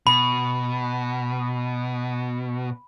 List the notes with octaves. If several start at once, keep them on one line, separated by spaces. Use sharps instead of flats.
B2 B5